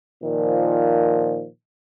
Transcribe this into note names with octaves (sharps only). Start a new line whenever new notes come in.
A#2 D#3 F3